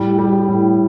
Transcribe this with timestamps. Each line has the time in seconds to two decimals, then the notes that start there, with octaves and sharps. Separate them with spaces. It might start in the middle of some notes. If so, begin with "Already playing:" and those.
Already playing: A2 G3
0.19 G3
0.48 A2